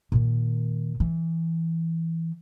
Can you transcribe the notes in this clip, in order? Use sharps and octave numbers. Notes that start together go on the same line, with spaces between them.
A#2 D#3
E3